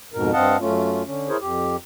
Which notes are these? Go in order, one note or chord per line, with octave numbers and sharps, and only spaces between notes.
F2 G#2 B2 A#4
G2 C4 D#5 F5 F#5 A5
F#2 A3 C#4 F4
D3 C#4
E4 G#4 A#4 C5 C#5
F2 G4